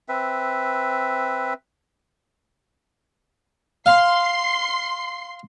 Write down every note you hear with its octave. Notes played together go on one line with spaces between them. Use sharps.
C4 B4 E5
F5 C6 C7